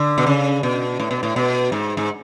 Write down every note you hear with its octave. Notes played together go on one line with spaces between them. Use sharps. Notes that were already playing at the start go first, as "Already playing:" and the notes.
Already playing: D3
B2
C#3
B2
A2
B2
A2
B2
G#2
G#2